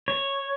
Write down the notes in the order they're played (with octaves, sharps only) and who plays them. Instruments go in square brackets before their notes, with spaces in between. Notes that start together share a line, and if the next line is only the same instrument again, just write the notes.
[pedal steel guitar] C#5